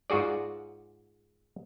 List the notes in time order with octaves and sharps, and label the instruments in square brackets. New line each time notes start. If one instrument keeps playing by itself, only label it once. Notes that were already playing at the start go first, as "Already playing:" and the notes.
[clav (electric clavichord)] G#2 F4 F#4 G#4 D5